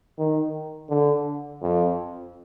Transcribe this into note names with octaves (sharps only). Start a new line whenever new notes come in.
D#3
D3
F2